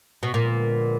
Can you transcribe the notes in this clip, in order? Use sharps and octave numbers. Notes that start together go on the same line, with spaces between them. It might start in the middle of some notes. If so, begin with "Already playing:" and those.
B2
A#2 D3 F3 G#3 B3